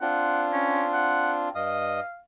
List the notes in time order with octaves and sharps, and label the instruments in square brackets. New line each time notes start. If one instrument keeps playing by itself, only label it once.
[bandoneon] C4 D4 F4 [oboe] F#5
[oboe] C#4
F#5
[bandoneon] G2 D#5 D#6 [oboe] F5